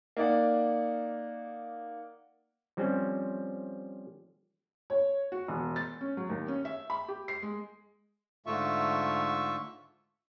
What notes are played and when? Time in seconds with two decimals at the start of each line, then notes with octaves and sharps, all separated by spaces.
0.17 A#3 D#4 D5 F#5
2.77 F3 G3 C4 C#4
4.90 C#5
5.32 F#4
5.48 E1
5.76 A6
6.01 C#4
6.17 F#3
6.30 D#2
6.48 C#4
6.65 E5
6.90 B5
7.08 G4
7.28 C7
7.42 G#3
8.46 G#2 D3 A3 F4 E5 C#6